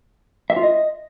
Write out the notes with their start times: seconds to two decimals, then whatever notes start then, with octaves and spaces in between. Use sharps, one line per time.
0.50 E5
0.56 F4
0.63 D#5